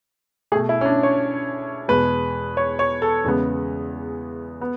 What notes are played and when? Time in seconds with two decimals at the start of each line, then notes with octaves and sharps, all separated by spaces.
0.52 A3 G#4
0.56 B2
0.69 E4
0.81 C#4
0.85 D4
1.03 C#5
1.88 E2 B2 G#3 B4
2.57 C#5
2.79 C#5
3.02 A4
3.24 E2 C#3 G#3 B3
4.61 B3